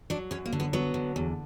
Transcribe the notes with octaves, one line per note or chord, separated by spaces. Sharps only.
F#3 D4
F#2 C#4
A#3
D3
B3
F#3 B3
D3
E2